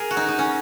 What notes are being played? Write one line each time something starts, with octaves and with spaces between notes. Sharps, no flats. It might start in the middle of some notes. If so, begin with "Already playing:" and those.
Already playing: G#4 A#4
F#4
D#4
D#4
C#4